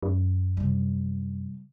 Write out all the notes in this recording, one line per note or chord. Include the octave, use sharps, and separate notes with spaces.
F#2
C3 G3